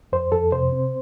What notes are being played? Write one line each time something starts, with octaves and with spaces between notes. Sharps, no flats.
F2 C5
F2 A4
C3 C5
C4